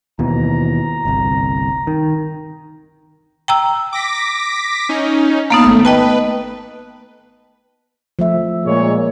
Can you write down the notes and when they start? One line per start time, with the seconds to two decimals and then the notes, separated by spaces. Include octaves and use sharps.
0.19 D#2 B2 E3 A#5
1.05 G1 C2
1.87 D#3
3.48 G5 A#5 E6
3.93 D6 A#6 B6
4.89 C#4 D#4
5.50 A#3 B3 D#4 F5 A5
5.64 G#1 A3
5.85 B4 D#5 G5 A5
8.19 F3 A3 E5
8.65 A#2 G#3 C#5